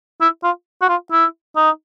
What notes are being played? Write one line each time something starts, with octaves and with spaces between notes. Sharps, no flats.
E4
F4
F#4
F4
E4
D#4